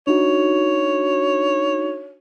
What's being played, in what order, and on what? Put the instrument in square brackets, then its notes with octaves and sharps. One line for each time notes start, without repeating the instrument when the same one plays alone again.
[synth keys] D4 D#4 F#4 [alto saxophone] C#5